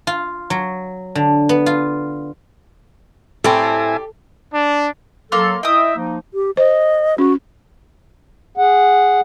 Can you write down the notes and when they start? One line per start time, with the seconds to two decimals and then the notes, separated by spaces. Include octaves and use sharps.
0.07 F4
0.50 F#3
1.15 D3
1.49 B3
1.66 F4
3.44 A2 C4 G4 A4 D5 E5 G#5
4.52 D4
5.32 F#3 A#3 A4 F5 C6
5.63 E4 D#5 E5 G5 D#6
5.96 F3 A#3 D#4
6.34 G4
6.57 C5 D#5
7.18 C#4 F#4
8.57 G#4 F#5